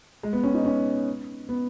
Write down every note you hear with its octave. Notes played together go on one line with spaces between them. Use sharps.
G#3
B3
C#4
D#4
C#4
B3